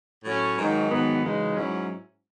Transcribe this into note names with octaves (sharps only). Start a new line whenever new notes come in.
A2 F#3 C#4
G#2 D#3 F#3
G#2 D#3 F#3 B3
F#2 C#3 E3 G#3 D#4
G#2 F#3 C#4 E4